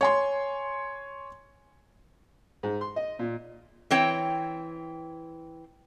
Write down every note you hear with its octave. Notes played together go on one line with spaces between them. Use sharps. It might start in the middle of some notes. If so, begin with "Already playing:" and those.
C#5 G#5 C6
G#2
C6
D#5
A#2
E3 C4 C#5 G5